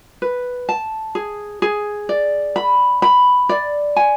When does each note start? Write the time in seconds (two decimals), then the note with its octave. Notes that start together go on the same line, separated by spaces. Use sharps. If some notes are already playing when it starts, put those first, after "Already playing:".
0.22 B4
0.69 A5
1.15 G#4
1.62 G#4
2.09 D5
2.56 B5
3.02 B5
3.49 D5
3.96 G#5